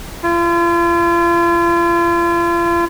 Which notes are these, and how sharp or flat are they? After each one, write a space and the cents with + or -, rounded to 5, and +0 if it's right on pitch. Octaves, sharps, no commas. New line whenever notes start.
F4 -40